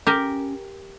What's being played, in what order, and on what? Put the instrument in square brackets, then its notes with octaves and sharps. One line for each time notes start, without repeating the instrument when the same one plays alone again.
[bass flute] C#4 [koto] G4 A#4